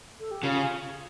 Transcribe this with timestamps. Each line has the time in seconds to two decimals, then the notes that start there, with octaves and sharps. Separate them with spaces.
0.20 A4
0.31 G4
0.43 C#3 F4